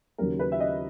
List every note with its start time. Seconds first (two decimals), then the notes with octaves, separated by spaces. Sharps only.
0.18 D#2 C#3 F#3 A#4
0.39 B4
0.52 E5
0.60 D#5